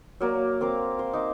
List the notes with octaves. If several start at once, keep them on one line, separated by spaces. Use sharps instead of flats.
F#3 A#3 D5
C4 A#4 F5 D6
C5
D#4 D6